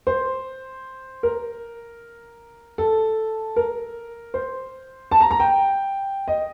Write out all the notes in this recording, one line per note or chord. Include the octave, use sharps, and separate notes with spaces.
C5
A#4
A4
A#4
C5
A5
A#5
A#5
G5
D#5